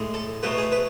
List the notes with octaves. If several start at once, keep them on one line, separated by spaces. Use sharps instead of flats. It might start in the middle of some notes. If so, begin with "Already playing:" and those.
Already playing: A2 G#3
A4
B2 F#3 A3 B4
G#4
B4